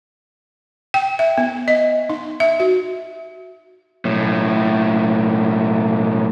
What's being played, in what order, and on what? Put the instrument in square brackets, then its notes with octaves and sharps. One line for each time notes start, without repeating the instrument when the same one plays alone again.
[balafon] G5
E5
B3
D#5
D#4
E5
F#4
[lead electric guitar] B1 A2